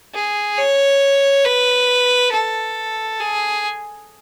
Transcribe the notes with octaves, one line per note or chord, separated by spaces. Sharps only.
G#4
C#5
B4
A4
G#4